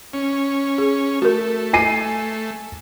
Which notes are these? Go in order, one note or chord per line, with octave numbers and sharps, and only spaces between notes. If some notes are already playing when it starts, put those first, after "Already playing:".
C#4
G#4
A3 F#4 A#4
G#5 C7 D#7